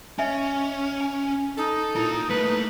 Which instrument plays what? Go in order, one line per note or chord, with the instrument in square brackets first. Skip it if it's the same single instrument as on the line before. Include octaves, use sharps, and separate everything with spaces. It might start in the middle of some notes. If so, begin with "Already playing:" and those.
[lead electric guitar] C#4 [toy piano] D#5 E5 G#5
[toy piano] G#5
[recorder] D#4 [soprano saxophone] A4
[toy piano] E4 [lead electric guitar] F4 A#4
[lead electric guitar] A3 A#3 [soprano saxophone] B4